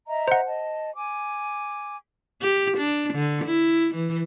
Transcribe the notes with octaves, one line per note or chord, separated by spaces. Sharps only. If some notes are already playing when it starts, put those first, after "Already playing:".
D#5 E5 A#5
C5 F#5
D#5 A5
G#5 D6
G4
D4
D3
E4
E3